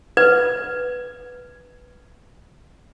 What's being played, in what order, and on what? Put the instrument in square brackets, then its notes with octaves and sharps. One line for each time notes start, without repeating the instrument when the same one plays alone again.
[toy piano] B4 [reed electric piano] G#6